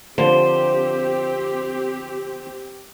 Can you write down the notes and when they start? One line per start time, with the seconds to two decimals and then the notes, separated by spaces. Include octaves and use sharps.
0.18 D3 F3 C4 G4 C5